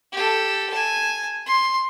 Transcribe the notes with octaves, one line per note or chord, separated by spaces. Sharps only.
G4 A4
G#5 A5
C6